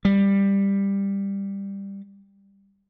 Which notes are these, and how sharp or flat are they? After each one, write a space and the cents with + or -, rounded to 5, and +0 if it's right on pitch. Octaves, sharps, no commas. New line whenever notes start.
G3 +10